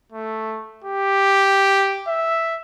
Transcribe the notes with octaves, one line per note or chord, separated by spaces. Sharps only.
A3
G4
E5